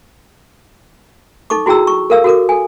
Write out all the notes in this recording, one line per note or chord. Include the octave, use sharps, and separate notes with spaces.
D#4 A4 C#6 D6
E4 F#4 G#4 G5 A#5 E6
C#6
A4 A#4 F5 E6
F#4 A4 A#4 D6
A4 G#5